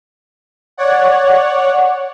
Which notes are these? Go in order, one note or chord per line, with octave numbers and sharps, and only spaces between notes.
C#5 D5 F#5